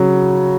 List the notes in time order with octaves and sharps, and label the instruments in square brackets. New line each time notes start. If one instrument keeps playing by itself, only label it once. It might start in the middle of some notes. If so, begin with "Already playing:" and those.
Already playing: [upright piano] C#3 F#3